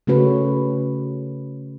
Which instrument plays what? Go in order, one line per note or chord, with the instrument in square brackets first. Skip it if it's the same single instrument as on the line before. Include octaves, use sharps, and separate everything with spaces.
[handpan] C#3 A3 C#4 F#4 B4